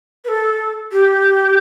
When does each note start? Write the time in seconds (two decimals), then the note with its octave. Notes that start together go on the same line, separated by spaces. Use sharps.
0.24 B4
0.28 A4
0.92 G4